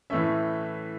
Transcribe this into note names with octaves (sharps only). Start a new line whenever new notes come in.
A2 E3 A3 C#4 E5